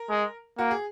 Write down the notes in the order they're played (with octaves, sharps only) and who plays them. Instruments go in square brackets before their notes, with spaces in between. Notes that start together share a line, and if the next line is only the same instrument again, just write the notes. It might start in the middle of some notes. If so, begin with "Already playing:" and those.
Already playing: [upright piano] A#4
[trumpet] G#3
[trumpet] A#3 [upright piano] F#4
[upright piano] G#4